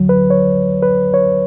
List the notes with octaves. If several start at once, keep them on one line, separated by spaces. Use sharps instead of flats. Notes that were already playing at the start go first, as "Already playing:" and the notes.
Already playing: D2 D3 F#3
B4
C#5
B4
C#5